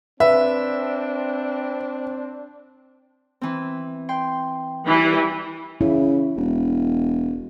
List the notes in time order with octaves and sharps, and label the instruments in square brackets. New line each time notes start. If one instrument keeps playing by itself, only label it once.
[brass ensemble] C4 [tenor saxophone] D4 [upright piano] B4 [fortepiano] E5
[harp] E3 C4
G5 C6
[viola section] E3 G3
[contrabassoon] C#3 [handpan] E4
[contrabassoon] E1